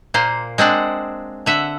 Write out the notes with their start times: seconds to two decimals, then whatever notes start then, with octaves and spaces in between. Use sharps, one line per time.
0.14 A#2 A#3 C5
0.58 G#3 C4 D4 F#5
1.46 D3 E5 F#5